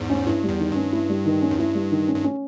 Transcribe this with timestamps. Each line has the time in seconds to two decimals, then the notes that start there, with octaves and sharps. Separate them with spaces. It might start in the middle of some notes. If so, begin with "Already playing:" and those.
Already playing: E2 G#2
0.10 C#4
0.26 G2 E4
0.43 G3
0.49 E2
0.59 D#3
0.71 G2
0.76 C#4
0.92 E4
1.10 G3
1.26 D#3
1.42 C#4
1.51 E2
1.59 G2 E4
1.75 G3
1.91 D#3
2.08 C#4
2.14 G2
2.24 C#4